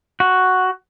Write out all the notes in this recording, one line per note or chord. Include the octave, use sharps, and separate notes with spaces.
F#4